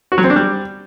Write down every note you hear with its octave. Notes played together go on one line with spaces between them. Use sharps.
F#4
F#3
C4
D4
G3